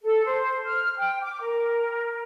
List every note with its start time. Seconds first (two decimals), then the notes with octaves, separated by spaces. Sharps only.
0.03 A4
0.24 C5
0.66 F6
0.98 G5
1.22 D6
1.40 A#4